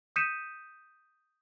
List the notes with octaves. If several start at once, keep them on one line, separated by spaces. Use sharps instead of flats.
D#6 G6 B6 C#7 D#7 E7